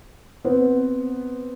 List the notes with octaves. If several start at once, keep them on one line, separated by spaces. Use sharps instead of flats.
B3 C4